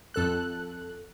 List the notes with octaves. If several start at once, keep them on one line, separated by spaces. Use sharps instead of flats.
F2 A4 F#6